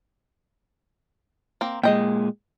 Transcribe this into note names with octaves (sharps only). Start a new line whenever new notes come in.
A#3 C4
A#2 G#3 D#5 G5